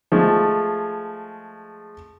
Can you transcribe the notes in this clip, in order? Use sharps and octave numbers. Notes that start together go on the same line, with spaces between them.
F3 G#3 A3